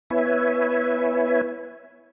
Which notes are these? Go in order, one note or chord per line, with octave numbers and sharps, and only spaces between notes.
B3 E4 B4 C#5 E5 G#5